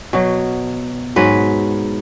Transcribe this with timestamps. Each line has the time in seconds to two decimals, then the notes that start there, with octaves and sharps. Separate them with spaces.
0.13 B2 F#3
1.16 G#2 F#3 B4